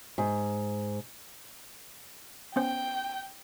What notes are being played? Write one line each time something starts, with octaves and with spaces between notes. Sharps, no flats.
G#2
B3 C#4 C5 G5